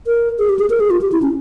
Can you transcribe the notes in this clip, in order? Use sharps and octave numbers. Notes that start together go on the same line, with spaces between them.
A#4
G#4
G4
G#4
A#4
G#4
F4
G4
E4
C#4